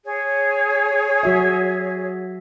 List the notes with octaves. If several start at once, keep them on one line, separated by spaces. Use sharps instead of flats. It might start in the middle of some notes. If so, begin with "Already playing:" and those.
G#4 C#5
F#3 F#4 E5